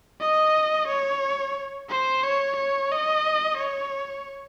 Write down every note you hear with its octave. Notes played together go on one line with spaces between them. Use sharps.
D#5
C#5
C5
C#5
C#5
D#5
C#5